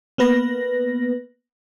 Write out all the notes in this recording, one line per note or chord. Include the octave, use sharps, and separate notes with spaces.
A#3 B3 B4 A#6